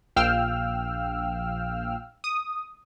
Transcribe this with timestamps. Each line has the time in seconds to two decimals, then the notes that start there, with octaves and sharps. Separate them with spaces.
0.16 A#1 F5 G5 E6 F6
2.24 D#6